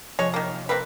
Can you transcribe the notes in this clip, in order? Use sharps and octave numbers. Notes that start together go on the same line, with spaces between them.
C3 F3 G#3 C#5
D#3 A#3
A#3 C4 B4